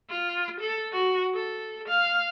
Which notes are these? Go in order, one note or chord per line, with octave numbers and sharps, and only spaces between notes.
F4
A4
F#4
A4
F5